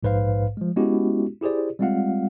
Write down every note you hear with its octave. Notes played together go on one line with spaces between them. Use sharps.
A#1 G#2 B4 C5 F5
F3 G#3
G#3 B3 C#4 E4 F#4 G4
E4 G4 G#4 C5 D5
G3 G#3 C4 F4 F5 F#5